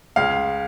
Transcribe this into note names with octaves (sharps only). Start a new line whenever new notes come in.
C#2 F5